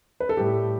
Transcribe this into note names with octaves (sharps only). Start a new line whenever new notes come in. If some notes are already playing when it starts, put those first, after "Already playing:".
B4
A4
A2 G3 G4